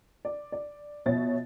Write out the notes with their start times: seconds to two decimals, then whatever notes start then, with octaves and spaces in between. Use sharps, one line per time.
0.25 D5
0.52 D5
1.06 B2 F3 C#5 E5 A6